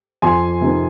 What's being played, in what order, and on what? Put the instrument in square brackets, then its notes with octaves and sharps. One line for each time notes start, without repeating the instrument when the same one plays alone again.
[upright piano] F2 G#5 C6
C3 D#3